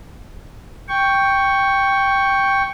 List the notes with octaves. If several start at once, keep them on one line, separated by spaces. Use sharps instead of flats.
G5 C#6